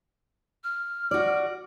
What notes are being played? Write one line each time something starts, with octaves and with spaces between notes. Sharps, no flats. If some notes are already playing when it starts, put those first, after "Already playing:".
F6
F#4 D5